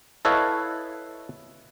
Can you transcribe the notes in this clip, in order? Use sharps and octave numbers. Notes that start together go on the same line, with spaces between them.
E4 A4 B4 C#5 D#5 F5